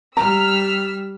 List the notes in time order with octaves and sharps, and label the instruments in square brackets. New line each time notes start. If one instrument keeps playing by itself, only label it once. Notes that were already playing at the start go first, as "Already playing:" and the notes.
[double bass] G3 [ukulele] A#5 [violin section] E6 F6 B6